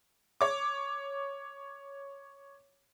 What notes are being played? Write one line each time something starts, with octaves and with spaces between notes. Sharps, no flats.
C#5 D6